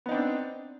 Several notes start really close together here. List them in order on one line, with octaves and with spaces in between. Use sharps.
B3 D#4 C4 D4